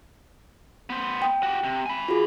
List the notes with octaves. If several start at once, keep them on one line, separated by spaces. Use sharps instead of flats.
B3 C5
G5 D#6
F#4 G4
C3
G#5 B5
F4 F#4 G#4